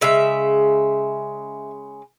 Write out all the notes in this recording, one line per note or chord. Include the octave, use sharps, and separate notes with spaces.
C#3 G#3 E5